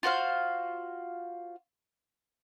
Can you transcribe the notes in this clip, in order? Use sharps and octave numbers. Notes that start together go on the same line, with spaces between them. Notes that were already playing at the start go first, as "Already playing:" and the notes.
F4 F#4 C5 F5